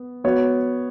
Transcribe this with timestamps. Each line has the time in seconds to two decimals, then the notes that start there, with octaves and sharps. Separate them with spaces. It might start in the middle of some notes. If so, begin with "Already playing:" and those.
Already playing: B3
0.24 B3 F#4 C#5